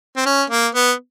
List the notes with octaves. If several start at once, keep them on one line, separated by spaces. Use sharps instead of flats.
C4
C#4
A#3
B3